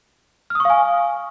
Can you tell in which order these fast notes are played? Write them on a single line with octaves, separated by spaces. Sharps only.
F6 D#6 C#6 F5 G#5